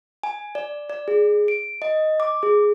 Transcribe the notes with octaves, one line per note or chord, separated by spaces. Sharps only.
G#5
D5
D5
G#4
D7
D#5
D6
G#4